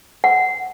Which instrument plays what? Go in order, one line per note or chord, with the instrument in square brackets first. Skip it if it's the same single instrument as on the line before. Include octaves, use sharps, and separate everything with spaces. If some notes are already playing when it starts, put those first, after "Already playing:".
[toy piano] F#5